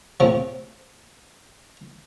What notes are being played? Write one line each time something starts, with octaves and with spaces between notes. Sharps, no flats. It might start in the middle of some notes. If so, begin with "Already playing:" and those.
A2 C3 F3